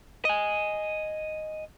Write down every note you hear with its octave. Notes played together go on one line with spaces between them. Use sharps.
D#5 G#5